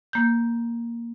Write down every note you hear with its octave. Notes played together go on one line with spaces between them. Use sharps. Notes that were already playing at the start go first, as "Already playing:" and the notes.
A#3 G6